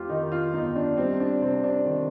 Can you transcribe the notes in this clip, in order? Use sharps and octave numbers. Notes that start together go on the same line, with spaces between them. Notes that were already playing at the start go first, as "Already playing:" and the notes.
Already playing: F2 A3 F4 G4
D#3 D#4
F4
G1 D#4
D4
G3 C4
D4
C3 C4
D4
D#3